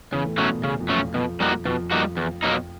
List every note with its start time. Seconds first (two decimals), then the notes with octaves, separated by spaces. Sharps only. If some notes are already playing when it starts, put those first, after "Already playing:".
0.12 E2 C#3 E3
0.24 A2 A3
0.38 B2 F#3 A3 B3 C#4
0.50 A#2 A#3
0.63 C#3
0.80 F2 F3
0.89 F#3 A3 C#4
0.97 F2 F3
1.14 F2 B2 F3
1.40 G3 A#3 D#4 F#4
1.65 F2 B2 F3
1.91 G3 A#3 D#4 F#4
2.17 E2
2.43 B2 F#3 A#3 D#4